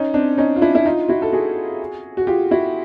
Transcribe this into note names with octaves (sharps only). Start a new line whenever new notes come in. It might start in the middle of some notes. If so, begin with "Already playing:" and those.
Already playing: C#4 D#4
C4 D4
C#4 D#4
F4
D4 E4
E4
D#4 F4
E4 F#4
A4
F#4 G#4
F#4
F4 G4
E4 F#4